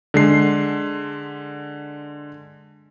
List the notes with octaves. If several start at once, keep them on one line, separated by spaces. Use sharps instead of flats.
D3 G#3 C7